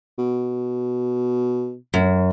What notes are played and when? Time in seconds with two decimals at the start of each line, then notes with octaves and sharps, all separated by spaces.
0.18 B2
1.94 F#2